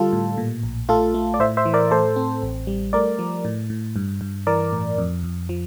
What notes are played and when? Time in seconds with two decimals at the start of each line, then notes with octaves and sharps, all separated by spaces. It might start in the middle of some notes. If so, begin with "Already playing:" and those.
Already playing: D3 G3 F4 A4
0.13 A2
0.37 A#2
0.63 A#1
0.89 A3 F4 A4
1.14 A3
1.34 D5
1.40 A2 C5 E5
1.57 C5 E5
1.66 E3
1.74 A#4 D5
1.91 A2 A4 C5
2.16 C4
2.42 A1
2.67 G3
2.93 A3 A#4 D5
3.19 F3
3.45 A2
3.70 A2
3.96 G2
4.21 G2
4.47 E3 A#4 D5
4.73 A2
4.98 F2
5.23 F2
5.49 F3